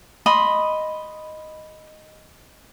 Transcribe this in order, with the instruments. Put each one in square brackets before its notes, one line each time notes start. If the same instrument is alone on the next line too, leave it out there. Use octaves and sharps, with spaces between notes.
[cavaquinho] D#5 B5 C6